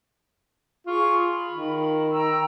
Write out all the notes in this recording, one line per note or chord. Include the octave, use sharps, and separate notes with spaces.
F4 G#4 C#6
B5
D#3
G5 A#5 E6